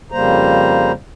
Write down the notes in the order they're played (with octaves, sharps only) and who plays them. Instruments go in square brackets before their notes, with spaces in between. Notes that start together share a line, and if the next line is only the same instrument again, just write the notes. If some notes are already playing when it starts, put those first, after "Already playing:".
[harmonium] F2 C#3 G3 A#3 C5 A#5